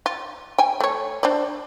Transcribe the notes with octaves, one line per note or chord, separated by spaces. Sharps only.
F4
G5 G#5
A3 C#5
D4 C5 D5